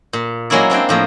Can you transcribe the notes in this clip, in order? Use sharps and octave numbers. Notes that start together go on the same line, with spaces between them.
A#2
F#3 G#3 A#3 C#4 E4 D5
G#3 C4 D4 G5
A2 F3 A#3